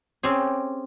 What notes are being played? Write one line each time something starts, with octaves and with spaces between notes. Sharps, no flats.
C4 C#4 G4 G#4